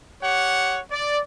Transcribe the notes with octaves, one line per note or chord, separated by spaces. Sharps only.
G4 C#5 F#5
D5